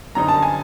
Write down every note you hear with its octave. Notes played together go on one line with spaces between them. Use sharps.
F#2 D3 G3 C4 D#4 A#5
A5
G#5